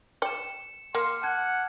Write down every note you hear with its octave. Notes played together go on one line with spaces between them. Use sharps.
D5 G5 C#7 E7
A#3 C6 D6 F6 C#7
F#5 A5 F#6 G#6